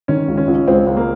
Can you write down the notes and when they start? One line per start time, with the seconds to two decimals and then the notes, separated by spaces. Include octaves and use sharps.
0.08 D#3 C#4
0.28 C#2
0.37 C#4
0.47 C#2
0.67 C#2 C4
0.86 C#2
0.97 A#3